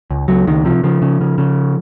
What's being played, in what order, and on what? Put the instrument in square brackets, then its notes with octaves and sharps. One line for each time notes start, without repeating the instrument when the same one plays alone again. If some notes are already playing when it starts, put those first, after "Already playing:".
[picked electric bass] C#2
C#2 F#3
C#2 D#3
C3 F3
C#3 F3
C#3
C#3
C#3